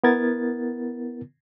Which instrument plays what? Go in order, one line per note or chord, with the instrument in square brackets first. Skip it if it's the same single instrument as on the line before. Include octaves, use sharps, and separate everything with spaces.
[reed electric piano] B3 E4 A#4 G#6 A6